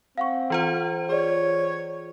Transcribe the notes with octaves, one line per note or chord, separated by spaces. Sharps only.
C4 F5 F#5 C#6
E3 F4 C5
G#4 C#5 D5